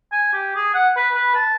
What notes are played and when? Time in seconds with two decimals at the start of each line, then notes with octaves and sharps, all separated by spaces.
0.12 G#5
0.34 G4
0.56 G#4
0.74 F#5
0.96 B4
1.14 B4
1.35 A5